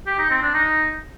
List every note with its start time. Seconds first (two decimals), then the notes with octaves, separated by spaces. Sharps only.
0.07 G4
0.19 D#4
0.30 C4
0.42 D4
0.54 D#4